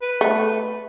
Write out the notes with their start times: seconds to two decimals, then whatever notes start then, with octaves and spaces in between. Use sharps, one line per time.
0.02 B4
0.21 A3